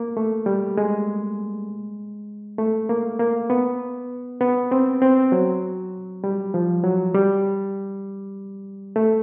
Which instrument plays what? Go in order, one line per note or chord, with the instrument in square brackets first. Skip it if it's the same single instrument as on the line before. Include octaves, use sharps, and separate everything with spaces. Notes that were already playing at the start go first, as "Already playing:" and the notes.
Already playing: [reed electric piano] A#3
A3
G3
G#3
A3
A#3
A#3
B3
B3
C4
C4
F#3
G3
F3
F#3
G3
A3